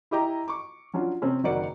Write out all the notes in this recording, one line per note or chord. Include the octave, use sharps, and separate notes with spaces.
E4 G4 D#5 G5 A#5
C#6 D6
F#3 C#4 D4 F4
C3 C4 C#4
F#1 D#3 F#4 A#4 D5 C#7